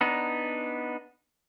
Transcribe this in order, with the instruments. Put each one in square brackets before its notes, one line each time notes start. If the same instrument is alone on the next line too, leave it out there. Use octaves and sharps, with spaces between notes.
[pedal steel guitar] B3 D4 D#4